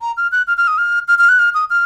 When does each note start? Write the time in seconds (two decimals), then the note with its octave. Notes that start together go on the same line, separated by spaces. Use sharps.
0.01 A#5
0.17 F6
0.32 F#6
0.47 F6
0.57 F6
0.68 D#6
0.78 F6
1.08 F6
1.19 F6
1.29 F#6
1.39 F6
1.54 D#6
1.70 F6